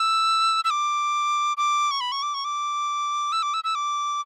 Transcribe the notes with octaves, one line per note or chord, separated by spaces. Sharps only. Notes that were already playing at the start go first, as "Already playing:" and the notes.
Already playing: E6
E6
D6
D6
C#6
B5
C#6
D6
C#6
D6
E6
D6
E6
E6
D6